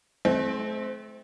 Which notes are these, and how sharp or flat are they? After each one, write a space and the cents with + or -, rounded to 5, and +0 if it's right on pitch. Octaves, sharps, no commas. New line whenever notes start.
A3 -40 C4 +0